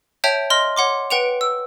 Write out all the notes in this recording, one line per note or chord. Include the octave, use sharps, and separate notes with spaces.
C#5 E5 G5 A5 G6 F7
D#5 C6 F6 A#6
C#5 F#5 C6 D6
B4 F#5 G5 D7 F7
E6